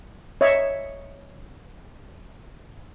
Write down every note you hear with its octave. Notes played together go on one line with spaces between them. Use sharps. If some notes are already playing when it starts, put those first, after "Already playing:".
C#5 D#5 E5